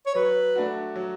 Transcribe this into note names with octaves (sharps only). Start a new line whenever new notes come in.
C#5
F#3 B4
A3 D4 F#4
F#3